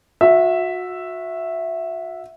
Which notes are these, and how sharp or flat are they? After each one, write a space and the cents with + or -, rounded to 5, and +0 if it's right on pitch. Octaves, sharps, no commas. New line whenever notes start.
F#4 -30 E5 +0